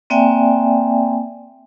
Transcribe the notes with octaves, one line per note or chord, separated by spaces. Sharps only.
A#3 C4 D5 E5 G5 G#5